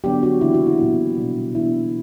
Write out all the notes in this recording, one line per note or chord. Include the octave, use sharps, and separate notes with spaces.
D3 F#3 B3 D4 G4
F#4
C#3 E3 A#3 D4 E4
F#4
E4
A#2 F#3 B3 D4 E4
B2 G3 B3 D4
E3 B3 D4 E4